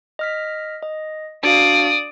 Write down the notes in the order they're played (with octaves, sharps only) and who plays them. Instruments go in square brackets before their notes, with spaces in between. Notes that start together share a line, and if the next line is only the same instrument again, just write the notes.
[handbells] D#5 F6 B6
D#5
[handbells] D4 F#4 F5 [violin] D5 D#6